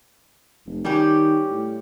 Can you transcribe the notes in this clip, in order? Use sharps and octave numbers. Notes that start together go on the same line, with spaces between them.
F1
D#3 G3 C#4 G4
A2